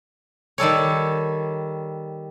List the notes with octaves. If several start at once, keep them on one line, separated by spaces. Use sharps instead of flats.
D#3 G3 A4 C#5